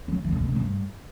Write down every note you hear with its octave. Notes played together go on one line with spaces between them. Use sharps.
F#3
E3
D3
B2
A#2
G2